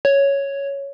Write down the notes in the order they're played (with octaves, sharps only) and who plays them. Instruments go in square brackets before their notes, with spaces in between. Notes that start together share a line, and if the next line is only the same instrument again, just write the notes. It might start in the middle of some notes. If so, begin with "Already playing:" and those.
[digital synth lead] C#5